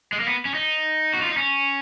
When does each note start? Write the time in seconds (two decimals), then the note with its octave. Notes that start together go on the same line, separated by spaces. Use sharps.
0.12 G#3
0.20 A#3
0.26 B3
0.45 C#4
0.54 D#4
1.13 F#4
1.22 F4
1.29 D#4
1.37 C#4